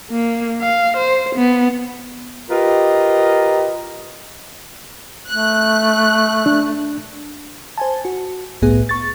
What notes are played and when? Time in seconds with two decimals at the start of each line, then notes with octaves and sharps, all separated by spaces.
0.11 A#3
0.61 F5
0.97 C5
1.36 B3
2.50 F4 G4 A#4 B4 D#5
5.30 A3 F#6
6.46 D4
7.78 C5 G#5 A5
8.05 F#4
8.62 G1 C2 A2 B3 G#4
8.89 C#6 A6